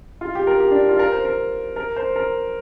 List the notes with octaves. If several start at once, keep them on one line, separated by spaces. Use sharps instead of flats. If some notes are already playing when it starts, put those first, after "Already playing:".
F4
G4
A#4
G4
D4
F4
A#4
C5
A#4
A#4
C5
A#4